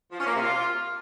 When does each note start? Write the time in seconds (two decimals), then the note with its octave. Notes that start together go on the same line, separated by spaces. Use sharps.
0.11 F3
0.19 C#4
0.27 A#3
0.35 C3
0.42 F4